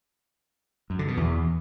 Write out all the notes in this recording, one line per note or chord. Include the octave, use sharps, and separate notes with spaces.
F#2
D3
B2
E2